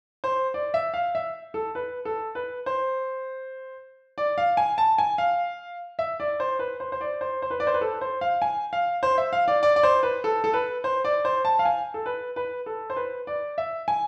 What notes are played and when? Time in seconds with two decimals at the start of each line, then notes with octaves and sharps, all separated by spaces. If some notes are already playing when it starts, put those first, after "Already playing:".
0.24 C5
0.54 D5
0.74 E5
0.94 F5
1.15 E5
1.54 A4
1.75 B4
2.05 A4
2.35 B4
2.66 C5
4.18 D5
4.38 F5
4.57 G#5
4.78 A5
4.98 G#5
5.18 F5
5.99 E5
6.20 D5
6.40 C5
6.59 B4
6.80 C5
6.92 C5
7.01 D5
7.21 C5
7.42 C5
7.50 B4
7.60 D5
7.67 C5
7.74 B4
7.81 A4
8.01 C5
8.21 F5
8.42 G#5
8.73 F5
9.03 C5
9.18 E5
9.33 F5
9.48 D5
9.63 D5
9.76 D5
9.83 C5
10.03 B4
10.24 A4
10.44 A4
10.53 B4
10.84 C5
11.05 D5
11.25 C5
11.45 A5
11.59 F5
11.65 G#5
11.94 A4
12.06 B4
12.36 B4
12.66 A4
12.90 C5
12.96 B4
13.27 D5
13.58 E5
13.88 G#5